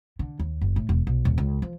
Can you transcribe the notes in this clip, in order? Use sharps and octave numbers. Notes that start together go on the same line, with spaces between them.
D3
D#2
F#1
A2
E1
B1
D#1
C#2
F3